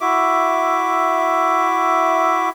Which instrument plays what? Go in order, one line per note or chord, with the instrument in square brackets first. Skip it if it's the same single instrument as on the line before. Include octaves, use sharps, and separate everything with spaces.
[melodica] E4 F#4 E5 D6